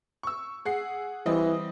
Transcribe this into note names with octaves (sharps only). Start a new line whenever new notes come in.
C#6 E6
G#4 F#5 C7
E3 G3 C4 D#5